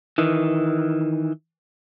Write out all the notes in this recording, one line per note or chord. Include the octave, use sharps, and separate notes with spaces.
D#3 E3